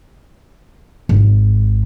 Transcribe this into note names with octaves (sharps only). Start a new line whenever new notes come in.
G#1